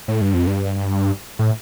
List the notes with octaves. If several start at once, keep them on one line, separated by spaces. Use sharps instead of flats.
A2
G2
F2
G2
A2